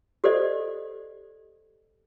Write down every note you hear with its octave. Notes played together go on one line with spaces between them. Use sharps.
G4 A4 C5 D5 D#5